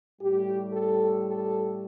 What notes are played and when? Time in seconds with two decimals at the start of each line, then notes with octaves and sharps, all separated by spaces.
0.21 A2 G3 G4
0.73 A4
1.27 A4